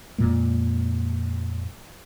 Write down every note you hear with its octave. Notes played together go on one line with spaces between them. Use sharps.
F2 A#2 G#3 A#3